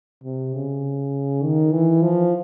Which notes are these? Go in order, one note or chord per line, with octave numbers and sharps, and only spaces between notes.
C3
C#3
D#3
E3
F3